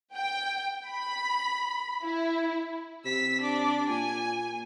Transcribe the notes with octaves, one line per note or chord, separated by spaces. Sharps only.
G5
B5
E4
C3 E6 B6
D4 D6
A#2 G#5